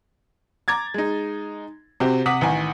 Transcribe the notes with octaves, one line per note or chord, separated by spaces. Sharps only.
A#5 D6 G#6 A6
G#3 D#4
C3 C4 F#4 G4
C3 F#5 D6 D#6 B6 F#7
A1 D#3 F#5 G#5